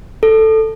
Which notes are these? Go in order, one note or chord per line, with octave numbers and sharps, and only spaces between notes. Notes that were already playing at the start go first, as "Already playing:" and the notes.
A4